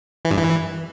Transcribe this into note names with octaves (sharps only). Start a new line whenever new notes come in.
E3
G2
E3